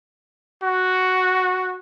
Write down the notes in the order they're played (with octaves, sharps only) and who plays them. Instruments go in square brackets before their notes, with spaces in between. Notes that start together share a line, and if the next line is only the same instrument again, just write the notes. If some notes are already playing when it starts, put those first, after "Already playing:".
[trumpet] F#4